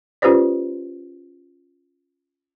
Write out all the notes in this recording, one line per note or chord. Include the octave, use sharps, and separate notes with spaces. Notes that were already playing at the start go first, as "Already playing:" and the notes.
C#4 F4 G4 B4 C5 D5